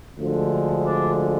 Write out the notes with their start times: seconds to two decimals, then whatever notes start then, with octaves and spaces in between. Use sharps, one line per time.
0.17 D2 D3 F3 G#3
0.87 D4